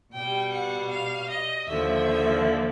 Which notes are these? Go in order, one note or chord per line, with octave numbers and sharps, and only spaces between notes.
B2 G3 G5
F#5
F5
D#5
D#2 D3 F3 E5